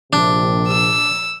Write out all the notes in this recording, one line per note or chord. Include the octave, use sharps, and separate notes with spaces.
A#1 C3 D4
E6